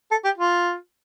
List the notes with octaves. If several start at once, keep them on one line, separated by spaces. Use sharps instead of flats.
A4
G4
F4